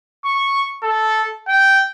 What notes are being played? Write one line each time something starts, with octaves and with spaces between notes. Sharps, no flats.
C#6
A4
G5